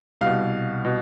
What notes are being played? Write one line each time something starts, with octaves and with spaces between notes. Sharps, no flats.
C2 B2 F5
B2